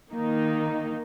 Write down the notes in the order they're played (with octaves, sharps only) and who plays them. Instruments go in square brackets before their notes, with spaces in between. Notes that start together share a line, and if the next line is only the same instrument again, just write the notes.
[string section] D#3 A#3 D#4